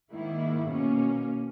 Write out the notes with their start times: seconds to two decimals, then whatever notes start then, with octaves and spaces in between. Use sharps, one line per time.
0.11 G#2 D#3 A#3 E4
0.68 B2 A#3 C#4